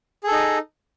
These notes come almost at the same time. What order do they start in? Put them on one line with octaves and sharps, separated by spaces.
G#4 A4 D#4